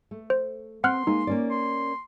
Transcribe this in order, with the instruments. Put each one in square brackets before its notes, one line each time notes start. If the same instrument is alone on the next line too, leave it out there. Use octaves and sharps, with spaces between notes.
[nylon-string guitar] A3
[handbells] C5
[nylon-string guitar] C4 [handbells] F#5 F6 F#6 [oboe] C6
[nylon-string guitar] G#3 A#3 [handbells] D#4
[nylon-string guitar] A#3 C#4 D5
[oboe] C6